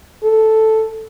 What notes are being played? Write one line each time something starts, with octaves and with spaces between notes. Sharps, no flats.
A4